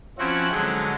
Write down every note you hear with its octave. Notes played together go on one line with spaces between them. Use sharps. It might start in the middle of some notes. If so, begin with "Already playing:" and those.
F3 C4 C#4 E4 F#4
D3 F#3 G#3